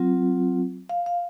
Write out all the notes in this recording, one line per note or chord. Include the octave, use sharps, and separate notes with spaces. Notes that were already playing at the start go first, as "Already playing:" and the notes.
Already playing: F#3 C4 F4
F5
F5